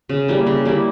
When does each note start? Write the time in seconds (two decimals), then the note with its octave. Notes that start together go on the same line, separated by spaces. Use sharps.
0.09 C#3
0.28 G3 A#3 E4
0.47 C#3
0.65 G3 A#3 E4